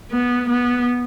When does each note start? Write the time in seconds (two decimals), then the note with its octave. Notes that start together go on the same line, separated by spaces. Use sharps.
0.11 B3
0.49 B3